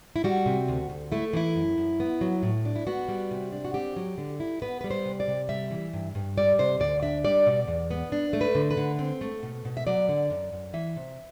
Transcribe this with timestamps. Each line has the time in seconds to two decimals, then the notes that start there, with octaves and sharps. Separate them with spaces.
0.16 E4
0.24 G3 F#4
0.46 C3
0.68 D2
0.90 D2
1.12 A3 E4
1.33 E3 E4
1.56 F#2
1.78 F#2
2.00 B3
2.21 F#3
2.43 A2
2.65 D4
2.76 E4
2.87 B3 F#4
3.09 G3
3.31 C3
3.52 D4
3.65 F#4
3.74 C4 G4
3.96 F#3
4.18 D3
4.40 E4
4.62 B3 B4
4.81 G3 B4
4.91 C5
5.05 C3
5.20 D5
5.28 C3
5.49 G3 E5
5.71 E3
5.93 G2
6.15 G2
6.37 G3 D5
6.59 C3 C5
6.80 D2 D5
7.03 D4 E5
7.24 G3 D5
7.46 B2
7.68 E2
7.91 B3
8.12 D4
8.33 A3
8.41 B4
8.55 D3
8.71 B4
8.77 D3
8.99 C4
9.21 A3
9.43 B2
9.65 B2
9.77 E5
9.87 F#3 D5
10.09 D3
10.30 F#2
10.52 F#2
10.74 E3 E5
10.96 C3